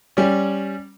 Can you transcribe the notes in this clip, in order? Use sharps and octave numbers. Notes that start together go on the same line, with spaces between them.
G3 C#4